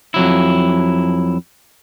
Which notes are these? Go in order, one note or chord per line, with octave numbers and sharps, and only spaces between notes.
F2 F#3 E4